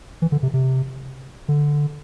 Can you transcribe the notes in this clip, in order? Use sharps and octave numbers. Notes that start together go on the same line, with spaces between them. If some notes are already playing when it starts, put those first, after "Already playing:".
E3
D3
C3
C3
D3